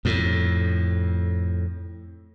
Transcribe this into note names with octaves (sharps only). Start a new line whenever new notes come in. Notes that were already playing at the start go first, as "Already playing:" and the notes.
F2 A2